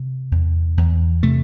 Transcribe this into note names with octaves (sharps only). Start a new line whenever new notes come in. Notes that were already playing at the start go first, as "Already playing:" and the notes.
Already playing: C3
E2
E2
C3 A3